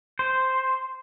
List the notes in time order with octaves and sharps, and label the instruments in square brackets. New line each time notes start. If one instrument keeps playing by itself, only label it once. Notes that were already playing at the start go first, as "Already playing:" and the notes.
[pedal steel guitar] C5